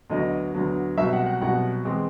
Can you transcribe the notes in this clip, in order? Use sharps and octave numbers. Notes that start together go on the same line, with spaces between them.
D2 D3 F#3 B3 D#5
D2 D3 F#3 B3
C2 B2 F#3 E5
F#5
F#5
C2 B2 F#3 F#5
E3 G#3 C4